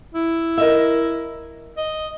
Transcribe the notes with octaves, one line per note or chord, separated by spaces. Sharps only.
E4
A#4 D#5 E5
D#5